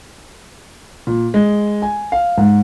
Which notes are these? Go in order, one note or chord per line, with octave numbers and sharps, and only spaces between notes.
A#2
G#3
G#5
F5
G#2